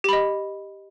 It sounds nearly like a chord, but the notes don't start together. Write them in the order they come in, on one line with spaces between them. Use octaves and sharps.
G4 B5 D#5